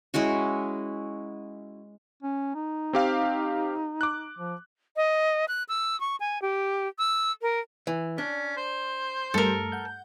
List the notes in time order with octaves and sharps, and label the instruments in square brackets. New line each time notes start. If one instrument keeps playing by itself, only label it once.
[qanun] G#3 C#4 E4 F#4
[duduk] C#4
D#4
[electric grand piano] C4 G4 F5
D6 F#6
[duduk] F3
[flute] D#5
F#6
E6
C#6
G#5
G4
E6
A#4
[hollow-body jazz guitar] E3
[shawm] C#4 [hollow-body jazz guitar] D4
[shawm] C5
[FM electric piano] G2 G3 A3 [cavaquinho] A4 A#4
[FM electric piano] F#5 G6